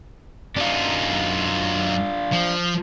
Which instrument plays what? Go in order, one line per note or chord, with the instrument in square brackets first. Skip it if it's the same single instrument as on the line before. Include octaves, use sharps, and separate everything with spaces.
[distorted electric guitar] F#2 D#4 [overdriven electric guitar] D4 F4
[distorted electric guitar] F3